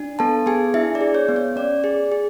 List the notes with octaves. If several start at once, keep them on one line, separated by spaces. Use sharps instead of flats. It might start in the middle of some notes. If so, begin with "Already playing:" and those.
Already playing: D4
B3 A4 A5
B3 G#4 G#5
D4 E4 E5
D5
G#4
C#5
B3
C#5
C#4 D5
G#4
G#4